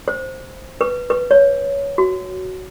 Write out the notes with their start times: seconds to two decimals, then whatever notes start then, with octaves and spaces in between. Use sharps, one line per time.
0.08 C5
0.81 B4
1.10 B4
1.31 C#5
1.98 F#4